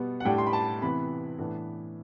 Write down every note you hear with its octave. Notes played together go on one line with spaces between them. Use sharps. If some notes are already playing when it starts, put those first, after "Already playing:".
Already playing: B2 G3 B3
F#5
A2 G3 D4 G5
C6
B5
A5
C3 E3 B3 B5
A2 E3 B3 D4